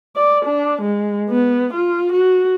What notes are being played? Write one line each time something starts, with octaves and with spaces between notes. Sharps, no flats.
D5
D4
G#3
B3
F4
F#4